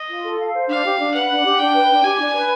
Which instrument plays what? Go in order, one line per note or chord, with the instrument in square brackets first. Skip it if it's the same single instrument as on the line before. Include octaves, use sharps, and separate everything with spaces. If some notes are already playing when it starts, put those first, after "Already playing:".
Already playing: [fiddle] D#5
[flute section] F4
A4
F5
C5
[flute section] D4 [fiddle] F5
[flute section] G4
D4
[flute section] B4 [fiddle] F#5
[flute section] D4
G4
[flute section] D4 [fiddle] G5
[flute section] B4
D4
[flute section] G4 [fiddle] G#5
[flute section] D4
B4